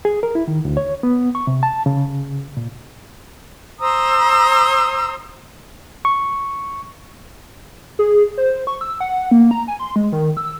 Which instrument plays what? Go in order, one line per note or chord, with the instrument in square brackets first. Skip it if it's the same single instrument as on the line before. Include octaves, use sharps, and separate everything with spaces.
[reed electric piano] G#4
A#4
E4
D#3
D2
C#5
B3
C#6
C3
A5
C#3
A#2
[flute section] C5 A#5 D#6 E6
[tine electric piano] C#6
[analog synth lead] G#4
C5
C#6
E6
F#5
A#3
A#5
G#5
C6
G#3
D#3
E6